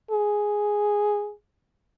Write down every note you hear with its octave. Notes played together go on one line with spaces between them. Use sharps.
G#4